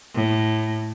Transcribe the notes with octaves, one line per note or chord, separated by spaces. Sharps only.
A2